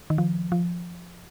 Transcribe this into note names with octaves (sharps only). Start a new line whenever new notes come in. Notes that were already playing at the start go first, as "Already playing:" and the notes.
D#3
F3
F3